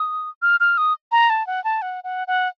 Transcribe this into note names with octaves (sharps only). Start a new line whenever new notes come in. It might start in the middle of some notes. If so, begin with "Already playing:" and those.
Already playing: D#6
F6
F6
D#6
A#5
A5
F#5
A5
F#5
F#5
F#5